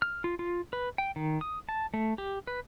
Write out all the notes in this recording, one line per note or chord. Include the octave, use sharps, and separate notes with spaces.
F6
F4
F4
B4
G5
D#3
D#6
A5
A3
G4
B4